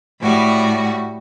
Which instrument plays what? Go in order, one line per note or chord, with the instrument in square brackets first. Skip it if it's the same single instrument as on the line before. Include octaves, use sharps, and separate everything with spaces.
[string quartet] A2 G3 F#4